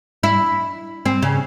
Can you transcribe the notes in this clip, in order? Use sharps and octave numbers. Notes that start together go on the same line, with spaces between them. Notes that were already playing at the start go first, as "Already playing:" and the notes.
E4
C4
C#3